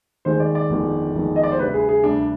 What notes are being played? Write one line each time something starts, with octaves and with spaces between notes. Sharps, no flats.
D#2 D#3 G#3 C5
D5
D5
G1 F2 D#3 G#3
G1 F2 D#3 G#3
D#5
D5
C5
D2 C3 G3 B4
G#4
G#4
D2 C3 G3 D4